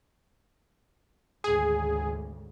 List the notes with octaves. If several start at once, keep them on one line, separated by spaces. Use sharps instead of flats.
G#1 D2 C#3 G#4